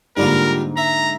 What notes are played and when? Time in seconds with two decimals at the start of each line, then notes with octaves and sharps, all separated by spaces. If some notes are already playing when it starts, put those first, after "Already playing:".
0.17 G#2 D3 G3 A#3 D4 F4 A#4
0.77 E5 A#5